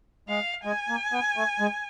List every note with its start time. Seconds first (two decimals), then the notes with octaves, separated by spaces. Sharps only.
0.29 G#3 F5
0.65 G#3 G#5
0.89 A#3
1.12 B3
1.37 A3
1.60 G#3